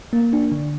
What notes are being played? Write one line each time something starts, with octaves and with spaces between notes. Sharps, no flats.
A#3
D4
D3